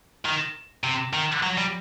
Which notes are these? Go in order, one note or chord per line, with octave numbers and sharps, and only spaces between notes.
D#3
C3
D#3
F#3
G3